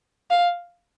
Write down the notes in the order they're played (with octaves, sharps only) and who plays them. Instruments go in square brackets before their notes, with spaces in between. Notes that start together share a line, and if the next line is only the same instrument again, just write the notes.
[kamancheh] F5